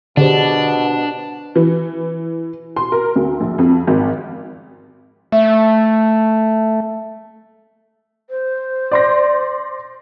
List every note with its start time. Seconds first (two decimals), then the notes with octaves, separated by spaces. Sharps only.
0.17 B2 D3 D4 G4 G#4 C5
1.56 E3
2.76 C6
2.92 A#4
3.16 D2
3.40 A#1
3.58 F2
3.87 G#1
5.32 A3 E5
8.30 C5
8.91 D5 C6 A#6